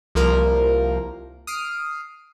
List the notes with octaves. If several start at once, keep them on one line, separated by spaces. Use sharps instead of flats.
C2 F3 A#3 A#4
D#6 F6 C7 D7